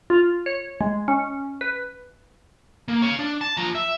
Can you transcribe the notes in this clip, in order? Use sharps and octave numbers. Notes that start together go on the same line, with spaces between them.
F4
C#5
G#3
C#4
B4
A#3
C#5 F5
D4
A5
F3 A#5
E5